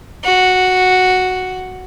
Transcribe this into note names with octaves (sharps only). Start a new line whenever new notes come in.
F#4